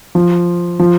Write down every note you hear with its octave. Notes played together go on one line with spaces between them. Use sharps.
F3
F3